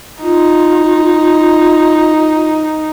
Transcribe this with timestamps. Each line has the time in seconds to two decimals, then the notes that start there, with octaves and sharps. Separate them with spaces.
0.22 D#4 F4